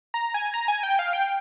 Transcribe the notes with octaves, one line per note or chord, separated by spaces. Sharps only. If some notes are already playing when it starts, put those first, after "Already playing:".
A#5
G#5
A#5
G#5
G5
F5
G5